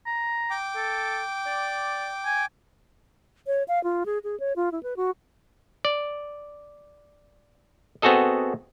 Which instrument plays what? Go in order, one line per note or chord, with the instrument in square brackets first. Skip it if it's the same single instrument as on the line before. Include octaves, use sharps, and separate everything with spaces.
[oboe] A#5
[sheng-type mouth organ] G5 D6
[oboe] A4
D5
G#5
[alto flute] C#5
F5
F4
G#4
G#4
C#5
F4
E4
B4
F#4
[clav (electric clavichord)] D5
B3 C4 F#4 G#4 A4 D#5